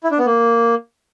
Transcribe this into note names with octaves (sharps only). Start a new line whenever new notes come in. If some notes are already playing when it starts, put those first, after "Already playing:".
E4
D4
B3
A#3